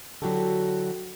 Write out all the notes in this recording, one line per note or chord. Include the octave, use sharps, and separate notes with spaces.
D3 F#3 E4 F#4 G4 A4